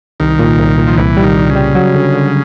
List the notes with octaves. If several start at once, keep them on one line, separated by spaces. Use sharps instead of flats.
C2 D#3
A#2
C2
A#2
F3
C2 E3
G3
D#3
C2
C#3
G3
F#3
D3
D3